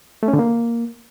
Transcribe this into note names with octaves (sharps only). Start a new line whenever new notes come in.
A3
C#4
D3
A#3